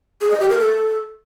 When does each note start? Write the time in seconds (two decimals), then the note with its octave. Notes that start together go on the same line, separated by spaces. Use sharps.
0.21 G#4
0.31 D#5
0.40 G4
0.49 A#4
0.59 A4